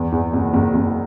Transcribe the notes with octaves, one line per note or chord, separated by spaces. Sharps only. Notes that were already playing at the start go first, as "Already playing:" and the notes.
Already playing: E2
E2
F#1
F#1
F#1